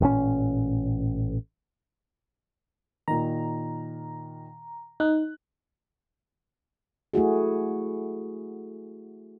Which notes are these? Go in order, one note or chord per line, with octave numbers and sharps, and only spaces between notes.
A1 G2 A#2 C#4
A#2 D#3 A#5
D#4 F#6
A3 E4 F#4 G#4